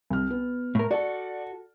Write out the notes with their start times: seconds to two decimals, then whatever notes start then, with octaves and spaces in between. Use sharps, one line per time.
0.10 C2 F6
0.31 B3
0.75 A2 A#4
0.91 F#4 A4 D5